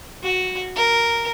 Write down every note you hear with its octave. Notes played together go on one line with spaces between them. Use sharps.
F#4
A#4